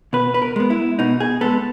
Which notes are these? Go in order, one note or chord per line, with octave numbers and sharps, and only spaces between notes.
B2 B4
B4
A#4
G#3 B3
E4
B2 D#4
G#4
G#3 B3 A4